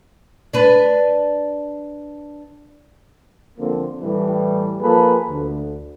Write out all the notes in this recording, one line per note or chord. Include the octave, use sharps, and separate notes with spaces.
D4 B4
D3 F3 A#3 C4
A2 E3 G3
F3 A#3 G#4 A4 B4
D2